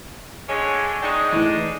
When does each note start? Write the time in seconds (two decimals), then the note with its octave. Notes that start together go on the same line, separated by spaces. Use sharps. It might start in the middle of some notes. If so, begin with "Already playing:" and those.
0.49 D3 G#3 C#5
1.02 G#3 D4 D#4 G5 C#6
1.32 A2 E3